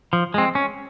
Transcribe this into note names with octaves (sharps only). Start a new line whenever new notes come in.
F3
G#3 C4
C#4